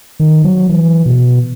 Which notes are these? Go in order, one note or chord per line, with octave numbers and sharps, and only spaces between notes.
D#3
F#3
E3
B2